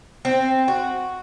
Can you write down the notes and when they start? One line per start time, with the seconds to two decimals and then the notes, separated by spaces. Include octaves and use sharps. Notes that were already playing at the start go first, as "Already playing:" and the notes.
0.25 C4
0.68 F#4